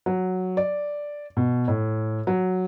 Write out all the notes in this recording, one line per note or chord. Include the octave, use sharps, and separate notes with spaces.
F#3
D5
B2
A2
F#3